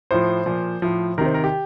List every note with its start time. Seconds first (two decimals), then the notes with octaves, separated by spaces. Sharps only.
0.11 A2 F3 C5
0.46 A#2 F3
0.82 A2 F3
1.18 C3 D#3 A#4
1.26 C5
1.34 A#4
1.44 G4